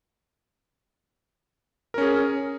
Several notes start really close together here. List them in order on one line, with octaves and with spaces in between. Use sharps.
A#4 C#4 G#4